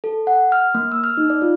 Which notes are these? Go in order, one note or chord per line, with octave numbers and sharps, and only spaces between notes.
A4
F#5
F6
A#3
E6
F6
D#4
D5
F4